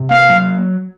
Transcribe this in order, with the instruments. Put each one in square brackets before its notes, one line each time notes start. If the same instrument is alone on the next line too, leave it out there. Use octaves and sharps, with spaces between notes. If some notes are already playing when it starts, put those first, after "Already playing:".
Already playing: [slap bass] C3
[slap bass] A#3 [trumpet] F5
[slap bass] F#3